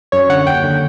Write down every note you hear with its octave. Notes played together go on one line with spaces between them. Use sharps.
F#2 C#5
D3 F#5
D#2 G5
D3